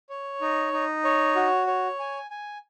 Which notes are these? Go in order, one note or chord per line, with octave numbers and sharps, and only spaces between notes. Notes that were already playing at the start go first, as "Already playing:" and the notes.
C#5
D#4
D#4
C#5
F#4
C#5
G#5
G#5